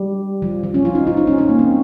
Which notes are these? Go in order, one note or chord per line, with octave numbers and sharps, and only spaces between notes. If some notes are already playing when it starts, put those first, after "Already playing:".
Already playing: G3
F3
F3
C#4
F4
D#4
F4
D#4
C#4
C#4
A#3
C4